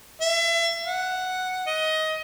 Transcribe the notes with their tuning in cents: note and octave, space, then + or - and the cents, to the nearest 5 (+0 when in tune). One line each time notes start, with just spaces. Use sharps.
E5 +35
F#5 +0
D#5 +20